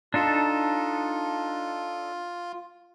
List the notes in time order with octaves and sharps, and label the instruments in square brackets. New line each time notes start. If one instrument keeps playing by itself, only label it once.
[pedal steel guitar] D4 D#4 A4 [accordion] F4